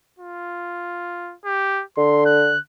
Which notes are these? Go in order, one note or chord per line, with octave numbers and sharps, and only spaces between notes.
F4
G4
D3 C6
F#6